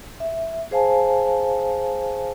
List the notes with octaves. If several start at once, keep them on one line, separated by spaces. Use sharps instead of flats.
E5
G#4 C5 F5 G#5 A5